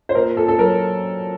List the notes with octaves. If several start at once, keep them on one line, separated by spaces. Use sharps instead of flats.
C5
A#2 A#4
A#2 A4
A4
F#3 A#4